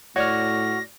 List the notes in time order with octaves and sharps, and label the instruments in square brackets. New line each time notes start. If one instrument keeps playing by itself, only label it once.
[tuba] A2 [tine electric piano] F#4 F6 [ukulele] C#5 D5 [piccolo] A#6